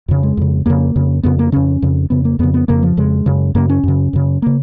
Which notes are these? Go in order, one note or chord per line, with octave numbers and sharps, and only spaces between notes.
F2 C#3
G#3
F2 C#3
F2 C#3 A#3
F2 C#3
F2 C#3 B3
A#3
F2 C#3 C#4
F2 C#3
F2 C#3 B3
A#3
F2 C#3 B3
B3
F2 C#3 A#3
F3
F2 C#3 G#3
F#2 C#3
F#2 C#3 A#3
C#4
F#2 C#3
F#2 C#3
C#3 A#3